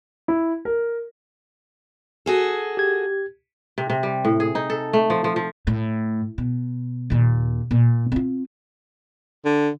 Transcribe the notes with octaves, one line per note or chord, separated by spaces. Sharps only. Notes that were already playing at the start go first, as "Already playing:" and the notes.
E4
A#4
F#4 G#4 A4
G4 G#6
C3
C3
G3
A2
G#4
D#4
A4
A3
F3
F3
F3
A2
B2
D#2 A#2
A#2
C4 F4
D3